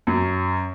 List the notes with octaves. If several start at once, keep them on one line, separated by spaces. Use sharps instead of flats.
F#2